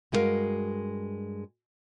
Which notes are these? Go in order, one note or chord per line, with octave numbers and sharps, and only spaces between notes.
G2 G#3 E4 F#4 A#4 F5